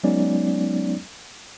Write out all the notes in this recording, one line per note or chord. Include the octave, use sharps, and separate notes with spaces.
F#3 G#3 B3 C#4 D#4 D5